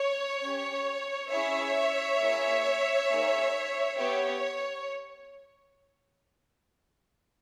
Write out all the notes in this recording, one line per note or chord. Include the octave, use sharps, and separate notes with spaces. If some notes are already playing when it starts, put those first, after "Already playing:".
Already playing: C#5
C#4 G4
C#4 E4 G#4 C#5 E5
A#3 E4 G#4
A#3 D#4 G#4
B3 G4 C#5